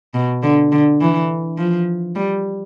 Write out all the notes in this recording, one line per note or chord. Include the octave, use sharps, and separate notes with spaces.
B2
D3
D3
E3
F3
G3